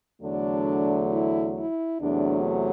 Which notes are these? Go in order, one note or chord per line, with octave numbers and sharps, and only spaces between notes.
E2 D3 F#3 A3 D4
E4
E4
E2 C3 F#3 A3 D4